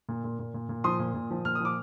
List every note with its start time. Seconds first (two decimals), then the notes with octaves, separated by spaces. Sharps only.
0.09 A#2
0.24 A#2
0.39 A#2
0.54 A#2
0.69 A#2
0.84 F3 C6 D#6
0.99 A#2
1.14 A#2
1.31 F3
1.45 A#2 F6
1.55 D#6
1.60 F3 D6